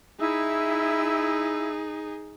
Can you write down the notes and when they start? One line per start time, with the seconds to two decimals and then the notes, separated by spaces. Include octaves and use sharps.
0.20 D#4 E4 G#4 E6